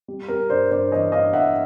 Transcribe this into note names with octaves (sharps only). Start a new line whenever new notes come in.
G3
G3 A#4
G2 C5 D5
G2 C5 D5
E3 C#5 D#5
G2 D#5 F5
G2 E5 F#5